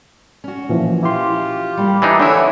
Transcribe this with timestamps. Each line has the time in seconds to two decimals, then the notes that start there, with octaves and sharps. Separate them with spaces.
0.44 C#4 F#4
0.69 A#2 E3 F3
1.03 E4 F4 G4 C6
1.77 G3 A#3
2.02 E3 D4 D#4
2.20 D3 D4 E4 C#5 E5 G#5